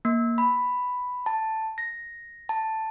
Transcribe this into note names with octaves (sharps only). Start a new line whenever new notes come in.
A#3
B5
A5
A#6
A5